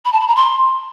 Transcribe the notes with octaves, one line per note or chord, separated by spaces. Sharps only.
B5
A5
B5
A#5
C6